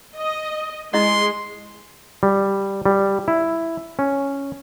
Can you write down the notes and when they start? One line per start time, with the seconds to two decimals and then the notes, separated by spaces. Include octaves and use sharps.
0.16 D#5
0.94 G#3 E4 D#5 C6
2.23 G3
2.86 G3
3.28 E4
3.99 C#4